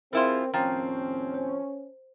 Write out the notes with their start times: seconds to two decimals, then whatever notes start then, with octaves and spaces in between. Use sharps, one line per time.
0.13 G3 C4 E4 F4 G#4 A#4 C5 C6
0.54 D#2 A2 F3 C4 C#4 G5 A#5 A6
1.34 C5